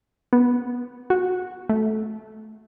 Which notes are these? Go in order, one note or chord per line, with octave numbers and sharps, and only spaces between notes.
B3
F#4
A3